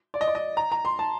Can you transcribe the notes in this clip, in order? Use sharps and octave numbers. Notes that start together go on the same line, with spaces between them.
D5
D#5
D5
D#5
A#5
A#5
C6
A5